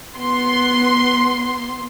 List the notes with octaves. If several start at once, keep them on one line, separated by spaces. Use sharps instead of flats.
B3 C6